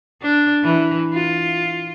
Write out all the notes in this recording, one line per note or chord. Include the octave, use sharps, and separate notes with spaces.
D4
E3
F4